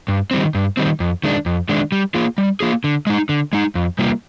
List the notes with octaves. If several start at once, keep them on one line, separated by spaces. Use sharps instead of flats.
G2
D#3 G3 C4
G2
D#3 G3 C4
F2
D#3 G#3 D4
F2
D#3 G#3 D4
G3
A#3 F4 G#4
G3
A#3 F4 G#4
D3
G#3 D#4
D3
G#3 D#4
F2
C3 G3 A#3 F4